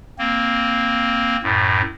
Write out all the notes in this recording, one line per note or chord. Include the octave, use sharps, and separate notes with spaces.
A#3 C4
F#2 A2